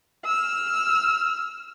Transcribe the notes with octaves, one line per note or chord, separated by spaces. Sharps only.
E6 F6